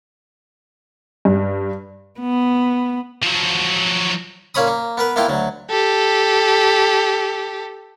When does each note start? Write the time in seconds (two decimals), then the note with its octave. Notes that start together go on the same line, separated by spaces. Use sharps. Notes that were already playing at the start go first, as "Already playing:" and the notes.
1.25 G2
2.20 B3
3.23 F3 F#3
4.55 A#2 A#3 C#4 C#5 B5 D#6
4.67 A#3
4.97 B3 A#4 B4
5.16 A#3 B3 E4 F4 F5 G5
5.29 D2 F#3
5.70 G4 A4